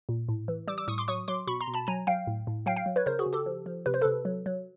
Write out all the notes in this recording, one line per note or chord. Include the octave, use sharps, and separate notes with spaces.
A#2
A2
E3
G3 D6 E6
D6 E6
A2 C#6 D#6
C6 D6
F#3 C#6 D#6
F#3 C6 D6
B2 B5 C#6
A#5 C6
B2
A5 B5
F#3 G#5 A#5
F#3 F5 G5
A2
A2
F#3 F5 G5
F5 G5
F#3
B4 C#5
C#3 A#4 C5
F#4 G#4
C#3
G4 A4
F3
F3
C3 B4
C5
C3 A4 B4
F#3
F#3